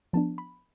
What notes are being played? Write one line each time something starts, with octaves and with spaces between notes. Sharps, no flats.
F3 B3 D4 A5
B5